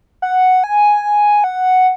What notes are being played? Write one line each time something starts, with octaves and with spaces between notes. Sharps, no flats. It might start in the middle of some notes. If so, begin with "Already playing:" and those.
F#5
G#5
F#5